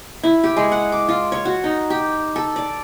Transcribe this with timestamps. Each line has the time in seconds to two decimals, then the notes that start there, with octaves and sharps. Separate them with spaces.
0.23 E4
0.44 G4
0.57 G#3
0.72 F#5
0.92 D6
1.08 F4
1.32 C#5
1.45 F#4
1.64 D#4
1.90 G4
2.36 A4
2.56 D5